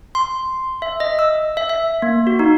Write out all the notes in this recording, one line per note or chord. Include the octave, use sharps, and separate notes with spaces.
C6
E5
D#5
E6
E5
E5
A#3
F#4
D#4